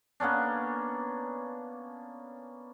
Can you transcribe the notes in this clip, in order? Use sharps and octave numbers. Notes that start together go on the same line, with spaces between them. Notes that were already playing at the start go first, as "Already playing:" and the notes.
A#3 B3 C#4 D4